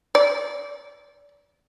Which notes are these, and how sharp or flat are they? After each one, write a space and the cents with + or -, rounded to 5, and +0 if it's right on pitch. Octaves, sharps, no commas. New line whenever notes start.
D5 -25